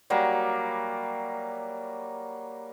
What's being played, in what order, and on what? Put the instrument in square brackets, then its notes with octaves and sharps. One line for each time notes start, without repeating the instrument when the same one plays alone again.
[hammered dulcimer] F#3 G3 A#3